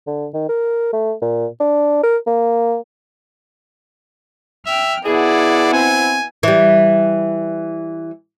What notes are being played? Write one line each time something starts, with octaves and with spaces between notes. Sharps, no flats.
D3
D#3
A#4
A3
A#2
D4
A#4
A#3
E5 G5 F6
B2 E4 G#4 D5 F#5
C4 G#5
E3 G3